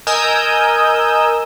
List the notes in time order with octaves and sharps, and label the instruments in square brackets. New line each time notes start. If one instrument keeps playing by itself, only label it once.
[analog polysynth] A#4 D#5 G#5 D#6 E6 G6